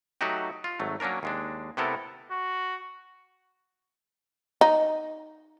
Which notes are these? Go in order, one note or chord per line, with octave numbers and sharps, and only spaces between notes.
F#3 A3 D#4 F#4 G4
F4
G#1 F#3 A3
F#3 A#3 C#4 D4 A#4
D#2 G#3 D4
C3 A3 B3 E4 A4 A#4
F#4
D#4